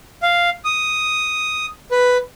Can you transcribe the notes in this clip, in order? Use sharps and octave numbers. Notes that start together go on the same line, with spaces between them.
F5
D#6
B4